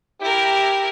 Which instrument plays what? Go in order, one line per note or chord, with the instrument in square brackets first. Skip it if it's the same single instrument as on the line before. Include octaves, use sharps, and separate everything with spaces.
[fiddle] E4 A#4 [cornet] G4